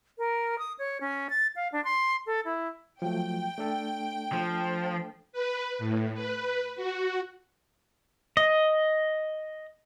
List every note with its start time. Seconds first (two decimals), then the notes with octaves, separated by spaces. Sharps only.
0.18 A#4
0.59 D#6
0.79 C#5
1.01 C#4
1.30 A6
1.56 F5
1.72 D4
1.84 C6
2.27 A4
2.45 E4
3.02 F3 F#3 A3 G5
3.58 A3 D4 A4
4.32 F3
5.33 B4
5.79 A2
6.14 B4
6.76 F#4
8.37 D#5